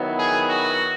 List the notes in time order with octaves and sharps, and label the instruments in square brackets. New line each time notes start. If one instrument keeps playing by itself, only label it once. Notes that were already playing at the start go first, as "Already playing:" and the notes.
Already playing: [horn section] D#3 F#3 B3 E4
G#4
F#4